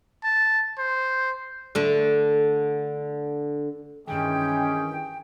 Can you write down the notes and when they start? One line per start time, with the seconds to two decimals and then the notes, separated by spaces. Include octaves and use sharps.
0.24 A5
0.78 C5
1.75 D3 A3
4.07 G2 D#3 E3 G#3 C#4 G4 G#4 G5